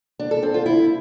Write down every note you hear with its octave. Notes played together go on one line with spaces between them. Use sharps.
D4
A4
C4
F4
E4